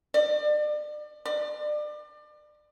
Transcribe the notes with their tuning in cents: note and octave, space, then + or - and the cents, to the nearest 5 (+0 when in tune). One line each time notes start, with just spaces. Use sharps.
D5 +35
D5 +30